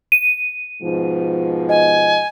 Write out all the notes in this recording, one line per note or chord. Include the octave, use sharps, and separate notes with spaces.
D#7
G#2 B2 F3
D#5 G#5